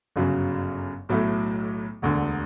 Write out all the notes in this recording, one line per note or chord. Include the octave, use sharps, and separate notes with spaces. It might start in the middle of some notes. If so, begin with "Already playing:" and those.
G1 F#2 C#3 F#3
B1 A2 F#3 A3
E1 D2 D3